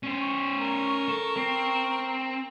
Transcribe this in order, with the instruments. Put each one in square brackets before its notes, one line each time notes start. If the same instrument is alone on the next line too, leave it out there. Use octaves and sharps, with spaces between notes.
[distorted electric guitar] C#4 C5
[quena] C#6
[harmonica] A#4
[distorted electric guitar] A4
C4